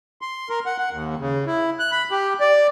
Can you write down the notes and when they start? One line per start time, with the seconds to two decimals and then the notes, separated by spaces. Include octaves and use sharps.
0.22 C6
0.49 A#4
0.66 F#5
0.79 F#5
0.92 D#2
1.19 C#3
1.46 E4
1.79 F#6
1.92 B5
2.11 G4
2.40 D5